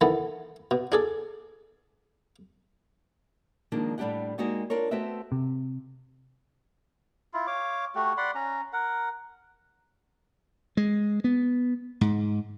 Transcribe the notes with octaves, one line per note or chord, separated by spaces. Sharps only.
D#3 E3 B3 A4
B2
D4 G#4 A4
D#3 F3 G#3 A#3 D4
A2 G3 D4 G4 F#5
G#3 A#3 D#4 F#4 G4 D5
D4 F4 A#4 C#5
A3 B3 C4 F#4 E5
C3
E4 F4
C#5 F5 D6
A3 F#4 G4
D5 F#5 B5 C6
C#4 A#5
A#4 F#5
G#3
B3
G#2